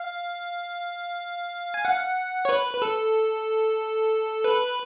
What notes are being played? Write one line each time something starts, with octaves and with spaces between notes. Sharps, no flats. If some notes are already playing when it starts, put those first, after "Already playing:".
Already playing: F5
G#5
F#5
C#5
B4
B4
A4
B4